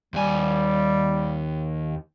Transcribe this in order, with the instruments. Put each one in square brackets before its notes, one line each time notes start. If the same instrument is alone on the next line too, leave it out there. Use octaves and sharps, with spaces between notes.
[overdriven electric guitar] D#2 G#5 [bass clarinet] G3